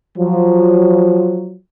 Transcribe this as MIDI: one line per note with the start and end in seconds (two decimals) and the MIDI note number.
0.16 1.55 53
0.16 1.55 54